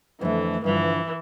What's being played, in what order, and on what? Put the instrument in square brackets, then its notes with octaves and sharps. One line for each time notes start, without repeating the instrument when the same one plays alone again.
[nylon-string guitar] F2 D3 A3 [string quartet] E3
[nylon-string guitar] G2 D3 F3 [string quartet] E3